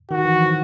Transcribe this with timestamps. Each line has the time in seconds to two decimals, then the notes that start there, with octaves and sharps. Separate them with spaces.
0.11 D#3 F#4
0.25 E3
0.40 F3